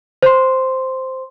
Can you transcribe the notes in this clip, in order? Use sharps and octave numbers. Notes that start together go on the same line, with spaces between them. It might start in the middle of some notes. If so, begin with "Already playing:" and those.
C5 C6